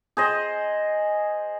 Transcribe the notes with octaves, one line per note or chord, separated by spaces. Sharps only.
G#4 C5 D#5